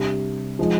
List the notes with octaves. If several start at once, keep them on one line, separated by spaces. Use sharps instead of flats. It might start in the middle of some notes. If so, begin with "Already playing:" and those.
Already playing: C3 G3 D4
F3 G#3 D#4